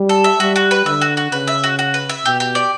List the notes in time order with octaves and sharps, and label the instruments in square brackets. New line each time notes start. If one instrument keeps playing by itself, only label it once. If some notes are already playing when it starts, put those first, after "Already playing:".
Already playing: [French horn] G3
[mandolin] A4
E5
[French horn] G3 [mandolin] F#4
[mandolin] F#4
B4
[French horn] D3 [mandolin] E5
[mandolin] F#4
F#4
[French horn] C#3 [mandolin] B4
[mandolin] E5
F#4
F#4
B4
E5
[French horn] B2 [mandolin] G4
[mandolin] G4
D5